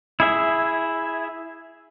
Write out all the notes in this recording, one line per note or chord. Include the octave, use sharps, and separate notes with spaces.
E4 G#4 E5